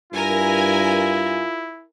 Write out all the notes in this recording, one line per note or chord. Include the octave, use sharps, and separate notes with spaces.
G2 E4 F4 A#4 G#5